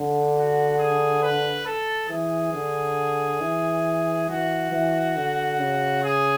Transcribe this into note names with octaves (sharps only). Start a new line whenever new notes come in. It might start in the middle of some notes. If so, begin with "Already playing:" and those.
Already playing: D3
F#4
G#4
B4
A4
E3 G#4
D3
E3
E3 F#4
E3
D3
C#3
G#4